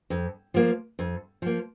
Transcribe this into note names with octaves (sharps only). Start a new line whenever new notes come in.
F2
F3 A#3
F2
F3 A#3